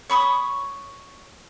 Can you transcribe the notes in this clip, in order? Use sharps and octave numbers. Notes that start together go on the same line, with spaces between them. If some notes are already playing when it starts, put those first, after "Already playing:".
C#5 B5 C#6 D#6